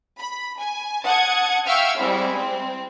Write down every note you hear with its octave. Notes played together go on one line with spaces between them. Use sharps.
B5
G#5
F#5 A5 D#6 G#6
E5 F5 G5 C#6 E6 F6
G3 G#3 C4 E4
C4